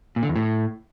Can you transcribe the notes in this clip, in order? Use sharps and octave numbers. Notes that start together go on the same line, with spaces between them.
A#2
D3
E2
A2